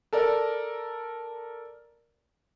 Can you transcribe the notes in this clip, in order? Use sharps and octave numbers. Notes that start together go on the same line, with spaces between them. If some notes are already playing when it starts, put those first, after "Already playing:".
A4 A#4 D5